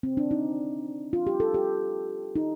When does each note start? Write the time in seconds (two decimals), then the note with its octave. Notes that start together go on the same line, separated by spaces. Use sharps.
0.03 C4
0.17 D4
0.31 D#4
1.13 F4
1.27 G4
1.40 A4
1.54 G4
2.36 D#4